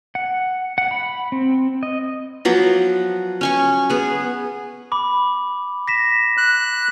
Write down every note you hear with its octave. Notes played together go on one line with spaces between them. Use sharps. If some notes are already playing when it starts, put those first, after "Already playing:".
F#5
F#5
B5
C4
D#5
F3 F#3 B3
C#4 G#5 C#6
B3 G#4
B5 D6
A#6 B6 E7
F#6